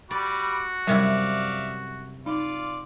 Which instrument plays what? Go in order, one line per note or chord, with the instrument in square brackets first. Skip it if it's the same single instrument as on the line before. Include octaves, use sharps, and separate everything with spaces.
[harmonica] G3 B5 D6 [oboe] F#4 [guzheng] D5
[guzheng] F#2 C3 E4 [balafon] G3 [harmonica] D5 E5 F5
[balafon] D#4 [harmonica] F4 D5